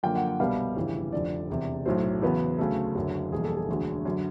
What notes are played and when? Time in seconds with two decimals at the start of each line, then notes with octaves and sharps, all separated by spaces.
0.03 F#2 D3 F3 A#3 G5
0.16 F#5
0.27 F#5
0.40 C2 B2 G3 B3 F5
0.76 G1 F2 C#3 E3 G3
1.13 F1 F2 D3 D5
1.50 E1 E2 C3
1.86 B1 A2 F#3 C5
2.22 E2 C#3 F#3 B3
2.58 D2 C#3 F#3 A3
2.95 F#1 F#2 D3 F#3
3.32 F1 E2 B2 G3 A#3 G#4
3.44 A4
3.57 G#4
3.68 E1 D2 D3 F#3
4.05 F#2 D3 F#3